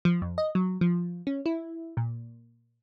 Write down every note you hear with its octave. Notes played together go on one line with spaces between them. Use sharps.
F3
F2
D#5
F#3
F3
C#4
E4
A#2